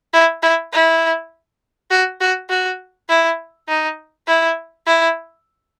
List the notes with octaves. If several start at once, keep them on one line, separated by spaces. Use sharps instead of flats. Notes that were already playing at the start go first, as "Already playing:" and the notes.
E4
E4
E4
F#4
F#4
F#4
E4
D#4
E4
E4